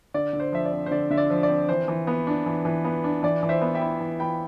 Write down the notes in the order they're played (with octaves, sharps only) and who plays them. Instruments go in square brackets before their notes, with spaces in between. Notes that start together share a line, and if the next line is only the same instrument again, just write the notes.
[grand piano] D3 D5
D3
C5
F3 E5
D5
C4
C5
D3 D5
D3 E5
D5
F3
D5
C4
E3 C5
E3
B3
D4
E3
E3
B3
D4
E3 D5
E3
C5 E5
B3
E5 G5
E4
E3
E3 G5 B5